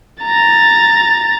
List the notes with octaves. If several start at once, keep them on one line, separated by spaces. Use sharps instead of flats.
A#5 A6